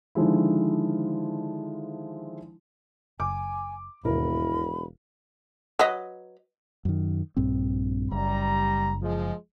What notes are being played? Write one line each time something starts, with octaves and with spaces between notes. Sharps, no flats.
D3 D#3 F3 G#3 E4
F#1 G#5 D6
E1 D#2 G#2 B2 E4 A#4 B5
F#3 B4 D#5
F#2 D#3
A#1 G2 C4
F#1 G3 A#5
F3 G#3